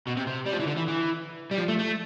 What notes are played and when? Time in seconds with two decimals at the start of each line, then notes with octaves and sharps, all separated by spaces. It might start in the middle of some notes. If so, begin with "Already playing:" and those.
0.07 B2
0.17 C3
0.27 C3
0.46 G3
0.53 F3
0.60 E3
0.67 D3
0.77 E3
0.88 E3
1.51 G3
1.58 F3
1.68 A3
1.79 A3